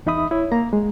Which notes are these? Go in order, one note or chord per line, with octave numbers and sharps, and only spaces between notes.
E2 D#4 E5 B5 D#6
E4 C#5
A#3 A#5
G#3